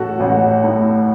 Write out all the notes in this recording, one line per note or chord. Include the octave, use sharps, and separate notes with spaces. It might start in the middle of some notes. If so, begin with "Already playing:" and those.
Already playing: A1 F#4 A4
A1
A2